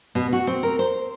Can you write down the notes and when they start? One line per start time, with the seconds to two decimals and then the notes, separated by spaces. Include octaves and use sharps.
0.15 B2
0.33 F#4
0.47 C4
0.63 A#4
0.79 C5